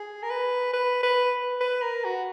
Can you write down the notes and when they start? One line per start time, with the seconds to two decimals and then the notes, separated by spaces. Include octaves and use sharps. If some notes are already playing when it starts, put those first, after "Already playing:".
Already playing: G#4
0.23 A#4
0.30 B4
0.73 B4
1.03 B4
1.61 B4
1.82 A#4
2.05 F#4